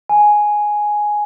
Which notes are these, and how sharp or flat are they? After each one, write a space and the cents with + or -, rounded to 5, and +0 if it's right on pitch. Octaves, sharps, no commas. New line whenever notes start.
G#5 +5